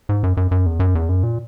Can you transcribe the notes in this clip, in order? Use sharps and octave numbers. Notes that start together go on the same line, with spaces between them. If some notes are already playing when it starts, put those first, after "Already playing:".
G#2
F#2
F#2
F#2
E2
F#2
E2
F#2
A#2